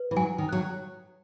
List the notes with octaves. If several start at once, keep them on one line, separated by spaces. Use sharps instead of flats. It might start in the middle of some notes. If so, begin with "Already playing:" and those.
Already playing: B4
E3
F#3 G#5
D#3
F#3 F#6